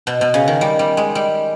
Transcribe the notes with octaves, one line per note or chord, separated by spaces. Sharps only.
B2
B2
C#3
D#3
G3
G3
G#3
G3